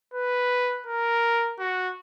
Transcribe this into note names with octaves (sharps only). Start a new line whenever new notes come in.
B4
A#4
F#4